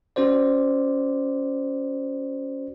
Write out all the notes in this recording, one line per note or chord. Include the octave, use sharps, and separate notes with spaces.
C#4 F#4 C5 D5